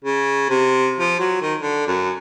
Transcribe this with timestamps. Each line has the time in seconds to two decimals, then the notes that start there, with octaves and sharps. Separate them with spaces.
0.05 C#3
0.49 C3
1.00 F3
1.20 F#3
1.42 D#3
1.60 D3
1.87 F#2